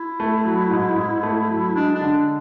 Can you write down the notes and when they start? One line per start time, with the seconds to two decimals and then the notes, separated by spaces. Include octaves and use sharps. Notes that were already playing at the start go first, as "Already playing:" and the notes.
Already playing: E4
0.20 A3
0.45 F#3
0.71 G#2
0.97 G#2
1.23 A3
1.50 F#3
1.75 G#3 D4
1.95 D4
2.01 D3